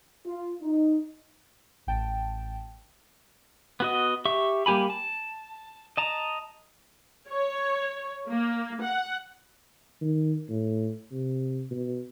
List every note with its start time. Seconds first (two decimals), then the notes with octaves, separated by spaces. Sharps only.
0.25 F4
0.61 D#4
1.87 A1 G5 A5
3.80 B3 F#4 D#5
4.25 G4 E5 C#6
4.66 G3 A#3 G4 G#5 B5
4.90 A5
5.97 D#5 A5 A#5
7.29 C#5
8.29 A#3
8.82 F#5
10.01 D#3
10.49 A2
11.11 C3
11.71 B2